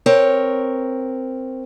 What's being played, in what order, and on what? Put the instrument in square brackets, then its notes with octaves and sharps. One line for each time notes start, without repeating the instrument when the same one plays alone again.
[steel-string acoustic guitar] C4 A#4 C#5